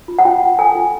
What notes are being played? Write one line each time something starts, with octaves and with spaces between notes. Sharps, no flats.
F4
F#5
F4 G5
F4
A4 G#5
F4